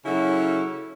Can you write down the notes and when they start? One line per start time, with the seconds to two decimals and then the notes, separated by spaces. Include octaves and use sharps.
0.05 C#3 F#3 C#4 E4 A4